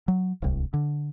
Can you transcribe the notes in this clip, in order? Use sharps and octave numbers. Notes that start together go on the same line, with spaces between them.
F#3
D1 C2
D3